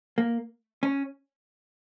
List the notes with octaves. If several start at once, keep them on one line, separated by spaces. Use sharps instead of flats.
A#3
C#4